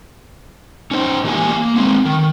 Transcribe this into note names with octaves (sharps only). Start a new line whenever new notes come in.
C#4 D#4 C5
E3 A#3 G4 D#5 G#5
A#3
G#3 B3 C4
D#3